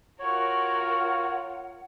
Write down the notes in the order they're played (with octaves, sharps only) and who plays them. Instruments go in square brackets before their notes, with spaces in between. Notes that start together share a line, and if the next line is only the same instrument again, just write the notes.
[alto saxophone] F4 [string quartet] F#4 A#4 [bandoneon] C#5 [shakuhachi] F#5